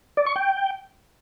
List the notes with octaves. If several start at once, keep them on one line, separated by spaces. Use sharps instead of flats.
D5
C#6
G5